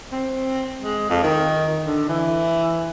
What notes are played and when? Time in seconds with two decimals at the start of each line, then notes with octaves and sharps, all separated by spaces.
0.12 C4
0.80 G#3
1.10 F2
1.23 D#3
1.84 D3
2.09 E3